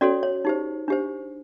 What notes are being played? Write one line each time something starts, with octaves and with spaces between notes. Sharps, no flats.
C#4 F#4 A4 C#5 D5
C#5
D#4 G4 C5
D4 G4 C5